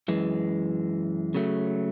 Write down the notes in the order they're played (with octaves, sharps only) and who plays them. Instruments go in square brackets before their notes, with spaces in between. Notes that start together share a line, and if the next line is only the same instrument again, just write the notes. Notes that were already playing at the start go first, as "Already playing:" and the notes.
[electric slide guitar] F#2 E3 G#3
C#3 F#3 A3